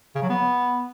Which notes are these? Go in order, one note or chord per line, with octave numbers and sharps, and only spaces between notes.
C#3
F#3
B3